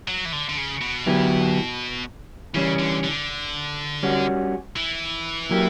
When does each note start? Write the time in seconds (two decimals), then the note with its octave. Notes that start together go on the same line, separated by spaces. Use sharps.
0.08 F#3
0.26 E3
0.33 D3
0.49 D3
0.57 C#3
0.81 B2
1.06 D3 F#3 B3 E4 G4
2.54 C#3 E3 G3 C#4
2.79 D3
3.04 D3
4.03 G3 C#4 F#4
4.76 E3
5.51 F#3 A#3 E4 G4